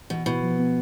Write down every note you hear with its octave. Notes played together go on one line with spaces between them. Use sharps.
B2 E3
B2 E4
F3
B3